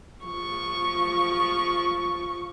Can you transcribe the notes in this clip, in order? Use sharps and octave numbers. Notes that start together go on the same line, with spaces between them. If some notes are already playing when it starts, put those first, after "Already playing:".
F3 C#6